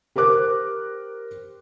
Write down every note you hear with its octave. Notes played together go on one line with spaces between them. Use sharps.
G4 A#4 C5 D6 F#6